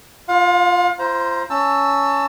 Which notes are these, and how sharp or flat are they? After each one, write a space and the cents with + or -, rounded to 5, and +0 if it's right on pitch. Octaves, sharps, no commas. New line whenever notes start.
F4 +0 F5 +40
F4 -35 C5 +0 A#5 +25
C#4 +15 A5 +20 E6 +0